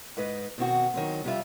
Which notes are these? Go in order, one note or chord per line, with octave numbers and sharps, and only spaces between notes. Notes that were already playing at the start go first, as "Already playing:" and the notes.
G#2 B4 D#5
B2 D#3 C4 F#4
D#3 F#3 C4
F2 C3 G3 A#3 F4 E5